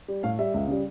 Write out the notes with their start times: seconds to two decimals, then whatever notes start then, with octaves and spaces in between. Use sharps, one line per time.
0.08 G3
0.23 A2 F5
0.39 G3 E5
0.54 C#2
0.68 C#3 G3